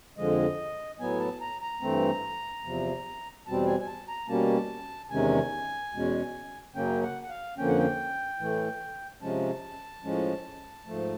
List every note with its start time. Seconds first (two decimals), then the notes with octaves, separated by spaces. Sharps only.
0.17 F2 D3 F3 G#3 D#5
0.99 A2 F#3 B3 G#5
1.20 A5
1.41 A#5
1.61 A#5
1.81 G2 E3 A3 C4
2.64 E2 C3 F3
3.46 E2 B2 G3 C4 A5
3.66 G#5
3.80 G#5
3.87 A5
4.08 A#5
4.28 B2 G3 A#3 C#4 A5
5.10 E2 C3 D#3 G#3 C#4 G#5
5.93 E2 B2 G#3 C#4
6.75 F#2 C#3 F#3 A#3 C#4 G5
7.03 F#5
7.22 F#5
7.29 F5
7.57 F2 D3 F3 A#3 C#4 G5
7.68 F#5
7.78 G5
8.39 A2 E3 A3
9.22 C3 F3 G#3 C#4 A5
10.04 A2 F3 G#3 C#4
10.86 G#2 F3 A3